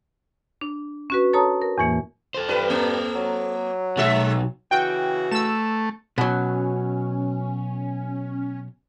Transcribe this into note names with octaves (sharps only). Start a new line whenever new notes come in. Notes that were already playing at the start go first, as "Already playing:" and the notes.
D4
C#4 F#4 B4
A4 C#5 A5 A#5 D#6
A#4
E2 A2 E3 A#3
A4 C5
G2 B4
A#3
F#3
B1 G#3 F#4 E5
C#3 E3 F#4 G5
A3 E6 E7
B2 F#3 C#4